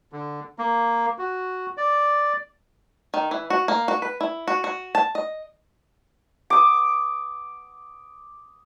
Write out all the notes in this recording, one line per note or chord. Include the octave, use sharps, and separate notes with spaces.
D3
A#3
F#4
D5
D#3
E3
F#4
A#3
F#4
B4
E4
F#4
F#4
A5
D#5
D6 D#6